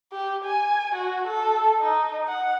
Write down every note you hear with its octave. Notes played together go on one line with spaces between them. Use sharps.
G4
G#5
F#4
A4
D#4
F#5